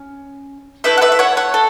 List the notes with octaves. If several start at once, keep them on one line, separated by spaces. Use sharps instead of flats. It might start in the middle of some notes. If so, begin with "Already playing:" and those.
Already playing: C#4
A3 E4 A4 B4 E5
F#5
B4 E5
E5
C#5 F#5
C#5 F#5
A4